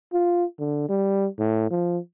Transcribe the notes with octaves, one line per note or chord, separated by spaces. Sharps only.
F4
D3
G3
A2
F3